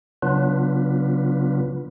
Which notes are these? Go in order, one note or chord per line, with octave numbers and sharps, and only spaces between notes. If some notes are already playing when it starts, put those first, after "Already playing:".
C#3 F#3 B3 D4 F4 B4